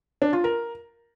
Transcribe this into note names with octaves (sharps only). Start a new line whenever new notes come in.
D4
F4
A#4